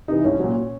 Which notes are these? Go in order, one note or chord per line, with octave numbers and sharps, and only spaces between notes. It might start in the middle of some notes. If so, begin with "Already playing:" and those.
C3 E3 D#4
C2 C#4
A#2 F#3